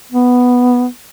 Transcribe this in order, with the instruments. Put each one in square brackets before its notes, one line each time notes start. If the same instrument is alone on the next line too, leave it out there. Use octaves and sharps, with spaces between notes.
[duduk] B3